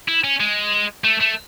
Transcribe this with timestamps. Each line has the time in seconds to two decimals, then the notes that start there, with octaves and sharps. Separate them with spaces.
0.08 E4
0.24 C#4
0.40 G#3
1.04 A3
1.21 A3